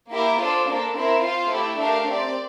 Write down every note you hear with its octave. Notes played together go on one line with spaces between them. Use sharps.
A#3 E4 G4 A#4
D4 F4 A4 C5
A#3 D4 A4
C4 E4 A#4 E5
F4 C5 F5
A3 E4 G4
A3 D4 G4 A#4 F5
C4 G4 D5